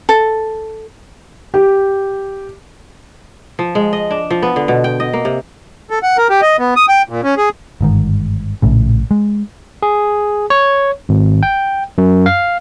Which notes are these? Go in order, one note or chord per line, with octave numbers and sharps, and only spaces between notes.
A4
G4
F3
G#3
D#5
D4
F3
B3
D3
B2
G5
D#5
A#3
C3
A4
F#5
A#4
G4
D#5
B3
D#6
G5
A#2
C#4
G#4
G1 G#2 D#3
A#1 A2 C#3
G#3
G#4
C#5
G#1
G5
F#2
F5